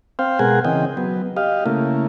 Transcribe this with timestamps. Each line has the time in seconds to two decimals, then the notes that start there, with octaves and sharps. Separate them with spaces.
0.19 C4 C5 F5 G5
0.39 B2 G#3 G#4 A#4 F#5 G#5
0.65 C#3 E3 C4 D#5 G5
0.97 F#3 B3
1.37 G4 D#5 F5
1.66 C#3 A3 A#3 E4